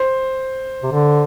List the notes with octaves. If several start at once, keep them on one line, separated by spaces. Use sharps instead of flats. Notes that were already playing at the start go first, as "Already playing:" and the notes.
Already playing: C5
C3
D3